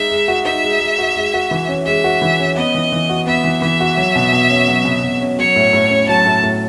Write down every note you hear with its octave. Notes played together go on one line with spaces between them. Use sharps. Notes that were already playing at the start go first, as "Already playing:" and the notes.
Already playing: G#3 D#4 E5
G#3
F#4
D#4 E5
G#3
G#3
F#4
G#3
F#4
E3
C#4
G#3 E5
F#4
E3
C#4
B3 D#5
E3
E3
F#4
B3 E5
E3
E3 E5
F#4
F#3
B2
B2
C#4
F#3
B2
B2
C#4
F#3 C#5
A2
A2
C#4
F#3 A5
A2
A2